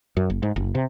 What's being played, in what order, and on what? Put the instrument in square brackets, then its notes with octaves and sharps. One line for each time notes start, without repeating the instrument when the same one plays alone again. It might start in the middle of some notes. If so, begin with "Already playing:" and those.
[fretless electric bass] F#2
F#1
G#2
F#1
C3